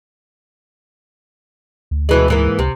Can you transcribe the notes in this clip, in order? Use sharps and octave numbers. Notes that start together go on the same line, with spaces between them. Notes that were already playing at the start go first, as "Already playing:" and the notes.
D2
B2 E3 G#3
G#2 E3 A#3
C#2 C3